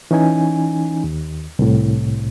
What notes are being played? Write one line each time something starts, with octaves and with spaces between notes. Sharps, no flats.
E3 C#4 D#4 G#5
D#2
C2 A2